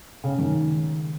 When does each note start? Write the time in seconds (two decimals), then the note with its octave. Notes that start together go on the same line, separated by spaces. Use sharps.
0.24 C#3
0.39 D#3